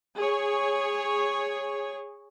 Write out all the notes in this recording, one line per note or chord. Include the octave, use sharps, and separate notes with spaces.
G#4 C#5